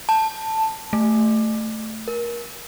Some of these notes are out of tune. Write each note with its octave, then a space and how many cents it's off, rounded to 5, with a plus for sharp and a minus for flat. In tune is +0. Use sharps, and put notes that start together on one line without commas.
A5 +5
A3 +5
A#4 +25